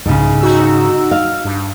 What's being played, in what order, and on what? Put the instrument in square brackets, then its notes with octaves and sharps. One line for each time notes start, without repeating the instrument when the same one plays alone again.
[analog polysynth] C2 [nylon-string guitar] G#2 C#3
[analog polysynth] D#4 F#4 E6
[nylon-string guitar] F5
[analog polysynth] G2